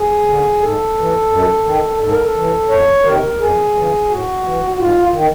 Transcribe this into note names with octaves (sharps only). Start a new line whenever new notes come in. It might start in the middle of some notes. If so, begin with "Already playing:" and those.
Already playing: G#4
D3
G#2 A4
E3
F#2
D#3
G#2 A4
A#4
A4
E3
F2 C#5
C3 D#3 A#4
F2 G#4
C#3 E3
A2 F#4
E3
F#4
G#2 F4
D#3